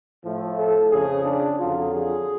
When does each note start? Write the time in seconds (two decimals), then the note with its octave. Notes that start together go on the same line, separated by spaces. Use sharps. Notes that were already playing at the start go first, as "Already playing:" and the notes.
0.23 A2 F3 A3
0.57 A4
0.91 F2 C#3 F3 G#4
1.25 D4
1.59 F2 D3 F#3 F4
1.94 G#4